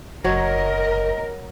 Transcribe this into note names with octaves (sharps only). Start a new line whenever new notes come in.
F#1 F#3 A#4 C#5 D#5